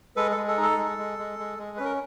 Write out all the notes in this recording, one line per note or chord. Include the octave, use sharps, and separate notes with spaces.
G#3 A4 B4
A4
G#3
A4
D#4
A4
G#3
G#3
G#3
G#3
G#3
C#4 B4
A#4